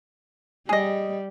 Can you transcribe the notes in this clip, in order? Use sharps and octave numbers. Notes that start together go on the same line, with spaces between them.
G3 G#4 D#5